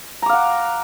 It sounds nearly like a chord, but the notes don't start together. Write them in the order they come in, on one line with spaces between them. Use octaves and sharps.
A#5 D6 F5 F#5